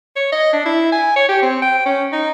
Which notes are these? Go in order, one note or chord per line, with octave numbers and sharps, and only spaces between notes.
C#5
D#5
D4
E4
G#5
C#5
G4
C4
G5
C#4
D#4